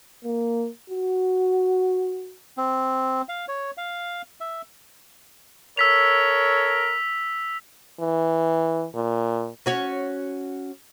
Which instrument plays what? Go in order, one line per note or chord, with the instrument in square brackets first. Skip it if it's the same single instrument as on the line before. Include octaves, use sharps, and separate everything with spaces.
[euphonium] A#3
F#4
[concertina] C4
F5
C#5
F5
E5
[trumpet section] A4 A#4 C#5 [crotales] E6 B6 F7
[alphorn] E3
A#2
[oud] C#4 F#4 C#5